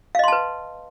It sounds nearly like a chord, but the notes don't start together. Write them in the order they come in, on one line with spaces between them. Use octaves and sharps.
F5 D#5 C6 A5 B4